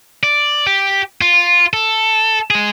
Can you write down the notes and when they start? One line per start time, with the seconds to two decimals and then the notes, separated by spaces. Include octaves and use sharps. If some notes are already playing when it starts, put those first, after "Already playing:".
0.23 D5
0.67 G4
1.21 F4
1.73 A4
2.51 G#3 G#4